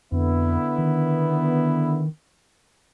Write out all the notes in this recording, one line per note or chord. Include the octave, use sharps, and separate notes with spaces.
F2 D3 B3 E4
D#3